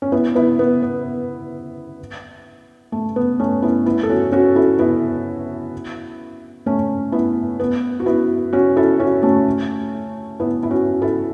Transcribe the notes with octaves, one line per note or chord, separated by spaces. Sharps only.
C#4
B3 E4
B3 E4
B3
B3
A3
B3
A3 C#4
B3 E4
B3 E4
A4
C#4 F#4
C#4 F#4
E4 A4
B3 E4
A3 C#4
B3 E4
B3
F#4
B3 E4
C#4 F#4
E4 A4
C#4 F#4
A3 C#4
B3 E4
E4
C#4 F#4
E4 A4